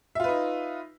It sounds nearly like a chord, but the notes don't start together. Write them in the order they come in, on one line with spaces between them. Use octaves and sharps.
E5 F4 B4 D#4